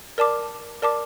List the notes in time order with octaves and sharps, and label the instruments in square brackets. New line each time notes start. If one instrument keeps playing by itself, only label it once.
[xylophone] A#4 D5 A5 D6
A#4 D5 A5 D6